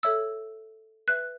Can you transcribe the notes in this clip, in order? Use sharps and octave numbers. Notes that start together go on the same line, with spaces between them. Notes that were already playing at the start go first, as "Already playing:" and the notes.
A4 C#5 E5 E6
B4 E5 F#6